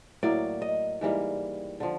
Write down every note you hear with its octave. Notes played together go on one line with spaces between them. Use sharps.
A2 F#3 A#3 D5
D#5
G#2 E3 G3 A#3
D3 F3